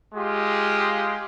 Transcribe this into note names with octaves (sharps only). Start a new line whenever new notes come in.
G#3 F4 G4